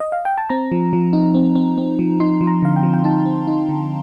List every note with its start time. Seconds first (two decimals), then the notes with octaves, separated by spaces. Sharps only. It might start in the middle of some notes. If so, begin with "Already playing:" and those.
0.00 D#5
0.12 F5
0.25 G5
0.38 A5
0.49 C4 A#5
0.72 F3
0.93 F3
1.13 D#4
1.34 C4
1.55 C4
1.78 C4
1.99 F3
2.20 D#4 C6
2.41 F3
2.47 A#5
2.62 D3 F5
2.76 G5
2.83 F3
2.93 G5
3.04 D#4 A5
3.26 C4
3.47 D#4
3.69 D3